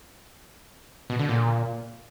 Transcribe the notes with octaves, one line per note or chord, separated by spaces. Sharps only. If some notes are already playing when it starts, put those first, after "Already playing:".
B2
D3
A#2